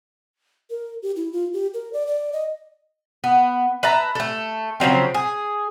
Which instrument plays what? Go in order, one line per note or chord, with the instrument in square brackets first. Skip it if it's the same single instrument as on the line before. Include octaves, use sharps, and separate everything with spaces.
[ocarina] A#4
G4
E4
F4
G4
A#4
D5
D5
D#5
[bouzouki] B3
B4 E5 A5 A#5
A3 A4
C#3 F3 F#3 C4
G#4